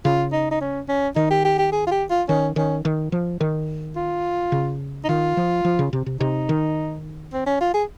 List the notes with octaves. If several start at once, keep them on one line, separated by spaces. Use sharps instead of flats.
C#3 F4
D#4
D#4
C#4
C#4
D#3 D#4
G4
G4
G4
G#4
F4
G4
F4
D#3 C#4
D#3 C#4
D#3
F3
D#3
F4
C#3
D#4
D#3 F4
F3
F3
C#3
C3
C3
C3 D#4
D#3
C4
C#4
F4
G#4